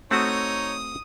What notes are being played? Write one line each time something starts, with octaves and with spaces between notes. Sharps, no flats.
A3 C4 D#4 F#4 C#5 D#6